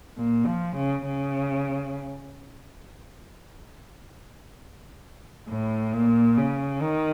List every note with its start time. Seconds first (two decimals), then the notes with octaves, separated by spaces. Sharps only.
0.17 A#2
0.46 F3
0.76 C#3
1.06 C#3
5.49 A2
5.93 A#2
6.37 C#3
6.82 D#3